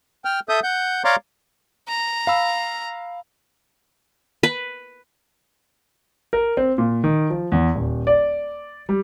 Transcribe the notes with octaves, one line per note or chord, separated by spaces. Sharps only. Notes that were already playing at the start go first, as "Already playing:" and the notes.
G5 F6
A4 E5 D#6 G6
F#5 G6
C#5 D5 F5 A#5 C6 D6
A#5
F5 B5 E6
B4
A#4
C4
A#2
D#3
F3
E2
D#1
D5
G3